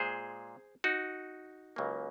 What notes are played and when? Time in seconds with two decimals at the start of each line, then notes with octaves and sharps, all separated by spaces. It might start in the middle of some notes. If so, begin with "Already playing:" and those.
Already playing: A#2 G#3 G#4 C5
0.84 D#4 F#4
1.76 C#2 C#3 F#3 A#3